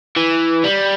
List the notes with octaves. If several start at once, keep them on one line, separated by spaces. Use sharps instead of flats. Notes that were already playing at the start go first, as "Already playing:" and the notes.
E3
G3